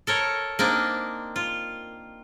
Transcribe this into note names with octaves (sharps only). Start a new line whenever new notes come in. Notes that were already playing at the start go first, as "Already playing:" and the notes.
A4 A#4 C#5
A#3 C4 D4 D#4
F4